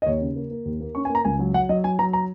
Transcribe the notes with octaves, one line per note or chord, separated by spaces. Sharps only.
D#5
D#2 C#5
C#3
A#3
A#3
D#2
A#3
C#4 C#6
G#5
A#3
A#5
C#2 G#5
F#3
F#3 F#5
F#3 D#5
F#3 G#5
F#3 A#5
A#5